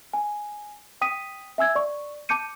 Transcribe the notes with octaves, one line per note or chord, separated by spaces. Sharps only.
G#5
G5 D#6 B6 D#7
E5 G#5 E6 G#6
D5 C#6
A5 D6 G6 C#7 D#7